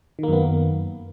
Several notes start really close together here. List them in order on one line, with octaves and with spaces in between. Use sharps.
D#3 A#3 F#2 B3